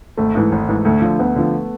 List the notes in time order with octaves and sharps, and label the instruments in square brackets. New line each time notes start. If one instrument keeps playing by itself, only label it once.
[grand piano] G#1 [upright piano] A3
[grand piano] G#2 E3
G#1
G#2 E3
[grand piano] D2 [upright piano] A3
[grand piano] D3 F3
[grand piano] D2 [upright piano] B3
[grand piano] D3 F3